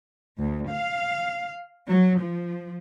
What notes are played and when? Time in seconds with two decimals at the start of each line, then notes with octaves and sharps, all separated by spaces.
0.39 D2
0.70 F5
1.88 F#3
2.21 F3